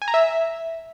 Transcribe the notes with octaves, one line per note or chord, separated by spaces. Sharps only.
G#5
A#5
E5